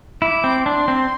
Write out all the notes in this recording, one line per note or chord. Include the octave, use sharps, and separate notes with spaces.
E4 D6
C4
D4 C6
C4